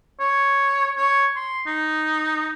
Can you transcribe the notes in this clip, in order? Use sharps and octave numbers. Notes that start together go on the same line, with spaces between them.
C#5
C#5
C6
D#4